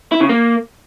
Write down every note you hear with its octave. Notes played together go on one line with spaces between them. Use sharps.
E4
C#3
A#3